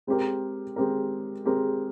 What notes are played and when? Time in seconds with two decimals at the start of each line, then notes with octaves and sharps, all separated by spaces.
0.07 G#3 C4 G4 A#4
0.76 G#3 C4 G4 A#4
1.46 G#3 C4 G4 A#4